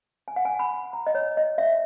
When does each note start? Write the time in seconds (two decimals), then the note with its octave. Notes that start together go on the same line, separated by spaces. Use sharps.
0.28 G#5
0.36 F#5
0.45 G#5
0.59 B5
0.93 A#5
1.07 D#5
1.15 C#5
1.37 D#5
1.58 E5